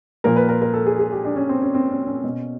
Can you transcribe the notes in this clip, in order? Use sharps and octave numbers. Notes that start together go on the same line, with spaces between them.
A#2 F3 A#4
B4
A#4
A#4
A4
G#4
G#4
G4
D4
C#4
C4
C#4
C4
C#4
C#4
B2